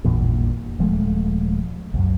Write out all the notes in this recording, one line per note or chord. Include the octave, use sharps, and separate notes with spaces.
A1 E2 G2 A#2
D#1 F3 G#3 A3
C2 F#2